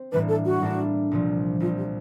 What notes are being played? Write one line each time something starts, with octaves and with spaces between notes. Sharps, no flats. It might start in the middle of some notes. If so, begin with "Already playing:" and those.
Already playing: C4
A2 E3 G3 A#3 D4 B4
A4
F#4
A2 E3 G3 A#3 D4
C2 A#2 F3
C2 A#2 F3 F4
G4